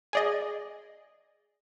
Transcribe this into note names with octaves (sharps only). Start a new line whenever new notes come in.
G#4 D5 D#5